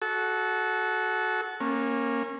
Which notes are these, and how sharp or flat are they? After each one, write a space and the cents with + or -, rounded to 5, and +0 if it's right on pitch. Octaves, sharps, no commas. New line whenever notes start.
F#4 +0 A4 -25
A#3 +0 C#4 -25